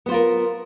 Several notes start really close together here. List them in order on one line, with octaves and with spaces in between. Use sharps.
B3 C5 F4 A#4